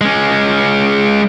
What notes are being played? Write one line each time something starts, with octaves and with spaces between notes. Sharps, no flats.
G#3 C#4